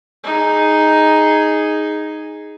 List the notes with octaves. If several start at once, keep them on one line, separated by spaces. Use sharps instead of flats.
D#4 G#4